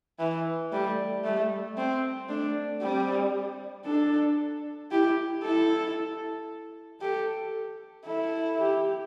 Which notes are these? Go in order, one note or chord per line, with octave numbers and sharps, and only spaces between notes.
E3
G3 A3
G3 A3
C4
A3 D4
G3 C4
D4 A4
E4 G4
E4 A4
G4 A4
E4 A4
G4